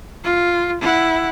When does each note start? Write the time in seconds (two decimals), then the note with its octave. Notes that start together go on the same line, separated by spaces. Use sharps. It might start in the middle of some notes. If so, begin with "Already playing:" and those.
0.24 F4
0.81 E4 F#5